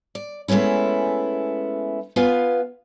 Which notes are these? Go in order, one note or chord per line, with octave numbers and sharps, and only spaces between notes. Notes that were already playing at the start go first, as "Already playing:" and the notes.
D5
G#3 A3 B3 C#4 E4
B3 F4 B4 F5 G#5